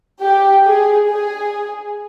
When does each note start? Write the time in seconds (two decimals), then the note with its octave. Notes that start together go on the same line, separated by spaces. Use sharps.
0.22 G4
0.65 G#4
1.08 G#4